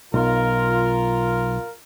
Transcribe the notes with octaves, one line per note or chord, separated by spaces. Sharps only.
B1 F4 A#4